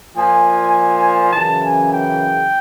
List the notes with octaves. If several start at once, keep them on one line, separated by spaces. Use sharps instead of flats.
A#2 F3 G#5
F#2 C#3 E3 A5
G#5
G5